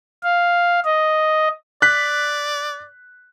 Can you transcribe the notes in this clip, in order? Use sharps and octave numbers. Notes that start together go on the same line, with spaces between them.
F5
D#5
D5 F#6 B6